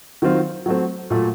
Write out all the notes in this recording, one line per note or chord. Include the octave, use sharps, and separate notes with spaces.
D#3 F#3 C4 F4
F#3 A3 C4
A#2 F#3 A3